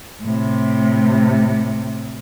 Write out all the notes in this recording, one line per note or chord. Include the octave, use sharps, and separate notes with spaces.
A2 C3